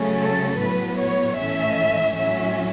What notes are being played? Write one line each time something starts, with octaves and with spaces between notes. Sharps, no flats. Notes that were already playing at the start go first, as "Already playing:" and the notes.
Already playing: C#3 F#3 A3 C#4
A4
A2 F#3 B3 B4
C#5
A2 E3 A3 C#4 E5
A2 F#3 C#4 E5